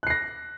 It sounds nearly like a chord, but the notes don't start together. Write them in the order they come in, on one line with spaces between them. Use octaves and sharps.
F#6 C7 A#6